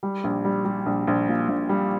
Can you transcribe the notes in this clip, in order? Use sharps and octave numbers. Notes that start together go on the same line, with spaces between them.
G3
A#1
G3
G3
A#1
A#1
A#2
A#1
G3